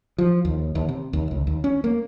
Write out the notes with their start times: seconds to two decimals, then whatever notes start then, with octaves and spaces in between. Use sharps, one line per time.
0.18 F3
0.45 D#2
0.75 D#2
0.89 C3
1.13 D#2
1.31 C#2
1.47 D#2
1.64 C#4
1.84 A#3